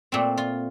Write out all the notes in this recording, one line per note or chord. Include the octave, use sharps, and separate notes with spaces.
A#2 A3 C4
F4